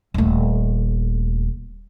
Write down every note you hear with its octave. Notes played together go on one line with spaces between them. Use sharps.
D#1 A3